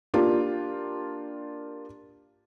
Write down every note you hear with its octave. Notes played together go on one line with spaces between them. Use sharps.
A#3 D4 F4 G4